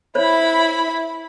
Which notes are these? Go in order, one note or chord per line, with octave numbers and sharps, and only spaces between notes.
E4 C5 C#5 B5